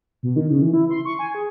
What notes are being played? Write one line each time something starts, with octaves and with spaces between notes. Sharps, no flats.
B2
D#3
C#3
E3
E4
C6
C#6
G#5
G#4